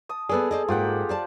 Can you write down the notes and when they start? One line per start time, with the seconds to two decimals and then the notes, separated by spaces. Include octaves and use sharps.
0.09 A5 D#6
0.29 B3 G#4 A4 B4 D5
0.51 C5 D5 D#5
0.68 G#2 A#3 F4 G4 F#5
1.09 C5 D5 A5